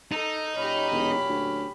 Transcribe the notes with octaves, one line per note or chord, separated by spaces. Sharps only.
D#4 A4
A#2 F#3 C#4 G4 B5
E1
D2